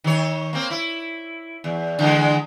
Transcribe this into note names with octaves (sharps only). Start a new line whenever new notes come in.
D#3 C#5
A#3 C4
E4
E2
D3 E3 G#3